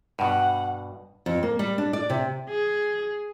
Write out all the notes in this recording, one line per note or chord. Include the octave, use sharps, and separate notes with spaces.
G2 B2 F#5
F2
A#3
G3
D4
D5
C3
G#4